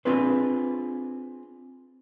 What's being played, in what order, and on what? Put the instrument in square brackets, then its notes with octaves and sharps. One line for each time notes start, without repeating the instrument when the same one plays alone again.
[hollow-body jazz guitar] C4 D4 F4 G#4 B4 C5